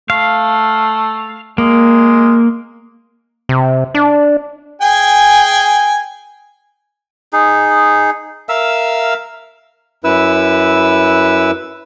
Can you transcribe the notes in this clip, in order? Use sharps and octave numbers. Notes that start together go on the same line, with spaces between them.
A3 F5
G#3 A#3
C3
D4
G#4 G5 G#5
D#4 G#4
A#4 E5 F5 E6
F#2 E4 B4 E6